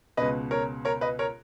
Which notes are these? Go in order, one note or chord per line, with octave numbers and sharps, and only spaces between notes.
C#2 B2 B4 D#5
A#4 C#5
A#4 C#5
B4 D#5
A#4 C#5